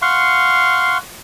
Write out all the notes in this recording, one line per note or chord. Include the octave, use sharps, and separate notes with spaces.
F5 F#5 C6 C#6